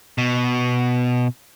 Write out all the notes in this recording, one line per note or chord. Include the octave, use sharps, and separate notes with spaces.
B2